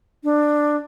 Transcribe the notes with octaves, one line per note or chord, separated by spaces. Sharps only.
D4